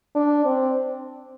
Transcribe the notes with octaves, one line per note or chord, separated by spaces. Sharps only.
D4
C4